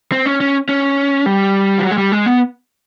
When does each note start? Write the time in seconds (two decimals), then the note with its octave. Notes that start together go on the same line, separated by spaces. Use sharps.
0.12 C4
0.26 C#4
0.41 C#4
0.69 C#4
1.26 G3
1.79 F3
1.83 F#3
1.91 G#3
1.98 G3
2.12 G#3
2.26 B3